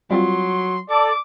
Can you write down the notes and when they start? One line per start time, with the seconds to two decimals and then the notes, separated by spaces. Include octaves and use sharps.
0.11 F#3 G3 C4 F4 C6
0.90 A4 D5 D6